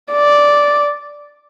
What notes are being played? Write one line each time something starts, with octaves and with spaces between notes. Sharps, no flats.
D5